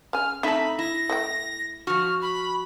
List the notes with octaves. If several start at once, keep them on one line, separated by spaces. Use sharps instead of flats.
C#3 G#5 F6
A3 C4 D#4 A4 E5 B5
E4 A#6
A3 E5 G5
F3 F#4 F6
B5